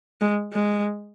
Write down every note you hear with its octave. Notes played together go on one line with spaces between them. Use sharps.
G#3
G#3